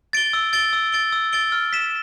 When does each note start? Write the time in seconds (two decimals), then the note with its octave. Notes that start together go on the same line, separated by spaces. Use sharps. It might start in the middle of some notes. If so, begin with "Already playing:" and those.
0.13 A6 D7 G7
0.33 E6
0.53 A6 D7 G7
0.73 E6
0.92 A6 D7 G7
1.12 E6
1.33 A6 D7 G7
1.52 F6
1.73 B6 E7